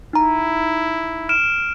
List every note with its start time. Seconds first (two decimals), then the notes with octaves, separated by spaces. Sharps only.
0.13 D#4 E4 A#5
1.29 F6 D7 E7